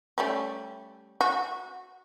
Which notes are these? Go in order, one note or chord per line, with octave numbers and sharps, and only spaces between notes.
G3 A3 C#4
F#4